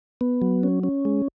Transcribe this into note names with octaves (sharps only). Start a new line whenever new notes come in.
B3
F#3
C#4
C#4
G#3